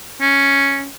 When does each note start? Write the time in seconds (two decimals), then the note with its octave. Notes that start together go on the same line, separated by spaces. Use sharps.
0.21 C#4